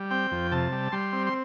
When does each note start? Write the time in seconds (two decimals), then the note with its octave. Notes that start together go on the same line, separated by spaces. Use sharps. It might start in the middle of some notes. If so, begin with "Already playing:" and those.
Already playing: G3
0.11 C4 G5
0.32 F2
0.52 C3 A5
0.72 G3
0.92 G3 C6
1.13 C4
1.27 C6